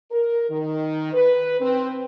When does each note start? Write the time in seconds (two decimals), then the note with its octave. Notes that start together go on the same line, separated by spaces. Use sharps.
0.11 A#4
0.49 D#3
1.13 B4
1.60 C4